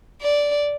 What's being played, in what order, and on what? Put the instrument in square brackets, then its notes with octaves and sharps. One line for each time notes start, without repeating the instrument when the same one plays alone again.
[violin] D5